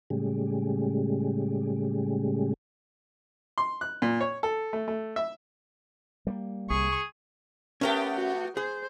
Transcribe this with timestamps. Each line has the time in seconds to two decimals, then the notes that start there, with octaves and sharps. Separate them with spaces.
0.10 A2 C#3 G3 G#3
3.58 C6
3.81 F#6
4.02 A#2
4.21 C#5
4.43 A4
4.73 A3
4.88 A3
5.16 E5
6.27 G3 A3 A#3
6.70 C2 C4 G#4 C#6
7.81 A3 B3 C#4 G4 A#4 G5
8.16 F#4
8.57 G#4 C5